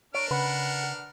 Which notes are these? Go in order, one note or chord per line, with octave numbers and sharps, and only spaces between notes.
D4 A#4 C#5 F6 D7
C#3 B4 F#5